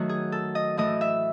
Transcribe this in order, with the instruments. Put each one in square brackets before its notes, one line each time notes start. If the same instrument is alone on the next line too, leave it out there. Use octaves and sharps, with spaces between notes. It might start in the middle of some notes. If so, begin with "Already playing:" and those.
Already playing: [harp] D#3 F#3 A3 F#4
G#4
A4
D#5
A2 E3 A3 D#5
E5